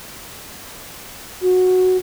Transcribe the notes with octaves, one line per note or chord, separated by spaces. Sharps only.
F#4